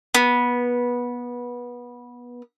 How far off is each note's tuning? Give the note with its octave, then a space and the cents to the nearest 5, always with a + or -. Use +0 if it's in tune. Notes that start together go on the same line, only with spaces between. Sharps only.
B3 -20